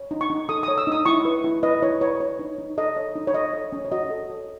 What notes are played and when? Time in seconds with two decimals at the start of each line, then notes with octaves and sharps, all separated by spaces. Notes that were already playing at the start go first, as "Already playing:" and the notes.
Already playing: C#5
0.11 D#4
0.21 C#6
0.30 D#4
0.49 A4 D#6
0.63 C#5 D#6
0.78 E6
0.87 D#4 D#6
1.06 E4 C#6
1.25 B4
1.44 E4
1.63 B4 D#5
1.82 E4 C#5
2.01 B4 C#5
2.20 C#5
2.39 D#4
2.58 D#4
2.78 A4 D#5
2.97 C#5
3.15 D#4
3.27 C#5
3.34 A4 D#5
3.54 C#5
3.72 C#4
3.85 C#5
3.92 F#4 D#5
4.10 A4
4.30 C#5